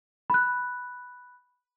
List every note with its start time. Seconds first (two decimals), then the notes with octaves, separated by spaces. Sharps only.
0.30 B5 F#6